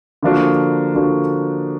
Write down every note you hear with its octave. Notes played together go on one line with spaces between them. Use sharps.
D3 F3 A#3 D4 F#4
D3 F3 A#3 D4 F#4